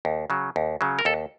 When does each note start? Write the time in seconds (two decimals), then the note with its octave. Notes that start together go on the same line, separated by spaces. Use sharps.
0.05 D#2
0.30 C#3 F#3
0.56 D#2
0.81 C#3 F#3
0.99 A#4
1.05 D#2 A4